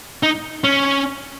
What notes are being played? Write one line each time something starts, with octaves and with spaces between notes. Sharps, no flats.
D#4
C#4